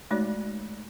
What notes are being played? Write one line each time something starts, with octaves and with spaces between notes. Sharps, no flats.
G#3 A3 D#4 F#4 C#5 D5